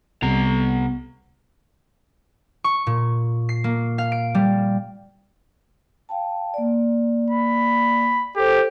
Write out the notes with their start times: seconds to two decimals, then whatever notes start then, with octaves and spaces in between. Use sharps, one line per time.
0.22 C2 C3 G3 B3 A#5
2.64 C#6
2.87 A#2
3.49 C7
3.64 A#3
3.98 F5
4.12 D7
4.35 G3
6.09 F5 G5 A5
6.54 A#3 D5
7.30 B5
8.36 G4 A4 C5